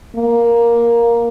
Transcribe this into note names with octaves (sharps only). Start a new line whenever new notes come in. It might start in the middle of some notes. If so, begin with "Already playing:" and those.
A#3